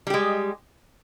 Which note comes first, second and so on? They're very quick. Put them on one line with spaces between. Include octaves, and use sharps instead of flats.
G3 G4 G#3